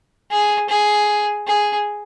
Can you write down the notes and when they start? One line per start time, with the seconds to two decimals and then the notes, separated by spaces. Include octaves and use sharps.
0.30 G#4
0.69 G#4
1.47 G#4